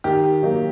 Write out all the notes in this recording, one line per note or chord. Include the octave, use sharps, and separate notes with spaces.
D#3 G4
F#3 A#3 D#4